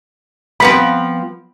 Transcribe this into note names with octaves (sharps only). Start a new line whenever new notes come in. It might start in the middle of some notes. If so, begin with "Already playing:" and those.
F3 B3 C4 B5